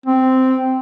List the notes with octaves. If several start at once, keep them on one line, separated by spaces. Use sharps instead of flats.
C4